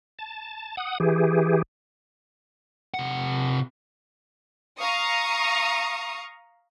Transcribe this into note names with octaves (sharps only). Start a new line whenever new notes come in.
A5
F#5 D#6
E3 G4 G#4
C3 F#5
F5 A#5 C#6 D#6